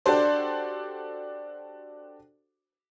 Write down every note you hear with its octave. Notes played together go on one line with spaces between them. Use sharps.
D4 F#4 G4 A4 C5 D5